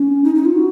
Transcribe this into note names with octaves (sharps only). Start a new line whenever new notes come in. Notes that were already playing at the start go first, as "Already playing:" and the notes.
Already playing: C#4
D#4
D#4
F4
F#4